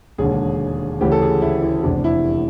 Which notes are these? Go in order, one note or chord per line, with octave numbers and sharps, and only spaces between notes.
E1 D#2 D3 G#4
D2 C#3 E3 G4
A4
G#4
E4
E4
F1 E2 C3 D4
E4